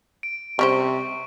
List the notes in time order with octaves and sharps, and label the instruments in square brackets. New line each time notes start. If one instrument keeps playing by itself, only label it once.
[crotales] D7
[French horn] C3 [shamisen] G3 C#4 C5 [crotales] C#6